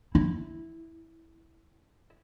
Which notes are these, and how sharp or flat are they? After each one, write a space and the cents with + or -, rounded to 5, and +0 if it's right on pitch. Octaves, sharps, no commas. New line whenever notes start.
E4 -10